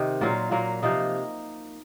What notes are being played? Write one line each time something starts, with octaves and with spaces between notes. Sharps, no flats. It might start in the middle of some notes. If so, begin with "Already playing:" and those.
Already playing: C3 D#3
A#2 F#3 A#3 F4
A#2 F#3 A#3
C3 F3 A#3 D#4